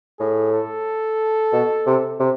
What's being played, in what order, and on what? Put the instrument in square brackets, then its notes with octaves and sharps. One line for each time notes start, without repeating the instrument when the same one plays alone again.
[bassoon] A2 [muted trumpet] G#4
[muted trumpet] A4
[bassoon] B2
C3
C3